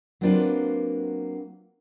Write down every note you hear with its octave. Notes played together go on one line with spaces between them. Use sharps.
F#3 A#3 C4 D4 F4 B4